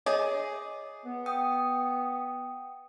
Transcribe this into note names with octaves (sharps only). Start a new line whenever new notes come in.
G#4 C#5 D#5 E5 G#5 D6
B3
G5 D#6